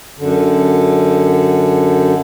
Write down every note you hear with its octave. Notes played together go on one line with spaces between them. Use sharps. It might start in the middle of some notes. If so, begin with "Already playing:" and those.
F#2 D3